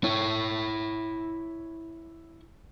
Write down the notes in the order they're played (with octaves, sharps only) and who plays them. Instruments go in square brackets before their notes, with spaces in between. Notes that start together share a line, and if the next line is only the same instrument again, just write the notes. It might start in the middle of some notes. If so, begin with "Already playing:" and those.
[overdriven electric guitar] E4 C#5